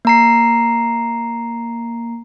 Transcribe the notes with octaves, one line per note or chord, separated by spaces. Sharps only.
A#3 A#5 C7